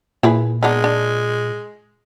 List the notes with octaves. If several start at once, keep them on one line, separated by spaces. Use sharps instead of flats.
A#2 E4 G#4 B4
G#3 B3 D4 D#4
D4